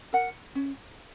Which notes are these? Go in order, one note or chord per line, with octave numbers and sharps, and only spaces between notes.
A#4 F#5
C#4